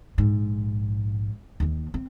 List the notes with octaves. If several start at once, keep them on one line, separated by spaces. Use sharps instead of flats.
A#1 G#2
D#2 D#3
C4